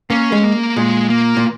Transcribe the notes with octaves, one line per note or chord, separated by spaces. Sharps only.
A#3 C#4
G#3
A#3
A#2 G#3
A#3
A#2